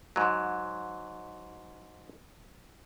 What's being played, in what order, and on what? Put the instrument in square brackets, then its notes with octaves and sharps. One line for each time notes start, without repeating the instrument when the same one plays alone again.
[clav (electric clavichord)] G#2 F#3